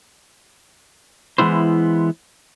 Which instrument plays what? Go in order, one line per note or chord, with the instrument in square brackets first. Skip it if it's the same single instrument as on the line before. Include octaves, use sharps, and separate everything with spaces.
[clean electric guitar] E3 G#3 B3 E4 C5